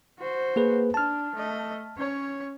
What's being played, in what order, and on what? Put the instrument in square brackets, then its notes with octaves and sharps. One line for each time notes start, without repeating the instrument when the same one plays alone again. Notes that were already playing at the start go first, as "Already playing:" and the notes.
[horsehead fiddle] F#4 C5
[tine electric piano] A#3 G#4 B4
[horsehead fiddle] D4 [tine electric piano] A5 F6
[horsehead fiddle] A3 D#5
C#4 C#5